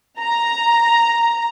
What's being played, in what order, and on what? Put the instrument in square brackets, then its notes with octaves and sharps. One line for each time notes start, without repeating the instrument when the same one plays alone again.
[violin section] A#5